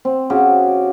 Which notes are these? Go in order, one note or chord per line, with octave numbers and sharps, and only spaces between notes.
C4
C#3 F#4 G4